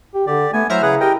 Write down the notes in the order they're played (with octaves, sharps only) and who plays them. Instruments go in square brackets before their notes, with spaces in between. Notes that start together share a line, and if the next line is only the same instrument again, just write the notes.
[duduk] G4
[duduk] D3 [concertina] G4 D5
[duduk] A3 [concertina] B3 G#5
[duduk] F#3 [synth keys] E4 A#5 [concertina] C5 E5 F6
[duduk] C#3 [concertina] G#4 B4 F#5
[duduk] G4 [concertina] A#4 D#5 G5